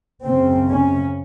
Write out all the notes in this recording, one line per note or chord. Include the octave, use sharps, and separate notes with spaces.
F#2 C#3 C4
C#4